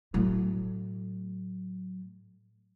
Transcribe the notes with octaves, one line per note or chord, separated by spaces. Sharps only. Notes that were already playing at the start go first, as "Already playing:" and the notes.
A2 F#3